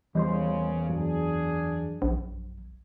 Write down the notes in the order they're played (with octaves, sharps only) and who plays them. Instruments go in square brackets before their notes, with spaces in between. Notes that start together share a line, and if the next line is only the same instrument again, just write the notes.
[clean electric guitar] E2 C5 C6 [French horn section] A#2 C#3 [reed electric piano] E3 G3 D#5
[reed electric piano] C2 F#2 F#3 [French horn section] D4 G#4
[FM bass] A#1